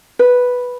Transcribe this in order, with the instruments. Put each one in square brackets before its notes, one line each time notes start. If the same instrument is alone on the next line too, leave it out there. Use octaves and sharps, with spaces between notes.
[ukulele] B4